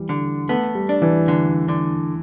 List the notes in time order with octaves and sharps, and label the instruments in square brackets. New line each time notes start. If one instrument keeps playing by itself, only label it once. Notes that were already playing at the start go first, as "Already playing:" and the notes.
Already playing: [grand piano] E3 G3
[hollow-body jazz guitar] D3
[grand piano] A3 [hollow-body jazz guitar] B3
[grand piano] G3
[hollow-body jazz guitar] D4
[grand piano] E3
[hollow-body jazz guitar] D3
D3